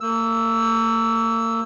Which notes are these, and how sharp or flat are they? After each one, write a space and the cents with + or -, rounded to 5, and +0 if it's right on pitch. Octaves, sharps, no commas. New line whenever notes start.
A#3 -40 E6 +0